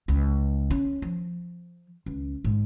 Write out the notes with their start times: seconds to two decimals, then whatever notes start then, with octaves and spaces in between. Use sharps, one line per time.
0.08 C#2
0.70 C#4
1.02 F3
2.06 C#2
2.44 G#2